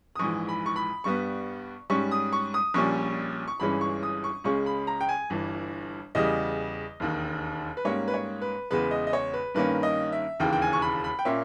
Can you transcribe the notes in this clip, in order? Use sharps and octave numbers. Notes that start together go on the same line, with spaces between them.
D#6
A#1 G#2 E3 C#6
B5
C#6
B5
G2 G3 B3 C#6
G#2 G3 C#4 C#6
D#6
C#6
D#6
A#1 A#2 G3 C#4 C#6
C#6
G1 G2 E3 G#3 C#4 B5
C#6
D#6
C#6
C#2 C#3 G#3 C#4 C#6
B5
A#5
G5
G#5
G1 G2 E3
E2 C#3 G3 D#5
E1 D#2 D#3
B4
G#2 G3 A#3 C#4 C#5
B4
C#5
B4
E2 C#3 G#3 B3 B4
D#5
D#5
C#5
B4
G2 D#3 A#3 C#4 B4
D#5
E5
E1 D#2 C#3 E3 G5
G5
G#5
C#6
B5
B5
G5
A#2 A#3 C#4 E5